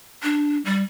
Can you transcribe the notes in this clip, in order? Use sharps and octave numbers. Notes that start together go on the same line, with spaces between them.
D4
G3